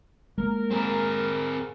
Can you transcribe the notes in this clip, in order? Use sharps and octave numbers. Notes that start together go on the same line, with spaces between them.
G#3 A#3 A#4
C4 G#4